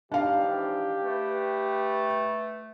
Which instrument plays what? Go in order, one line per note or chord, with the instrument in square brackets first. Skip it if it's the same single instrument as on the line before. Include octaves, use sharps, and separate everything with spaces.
[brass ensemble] G#2 D#3 E3 [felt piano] D4 F5 [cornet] G4
[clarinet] A3 [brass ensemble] B4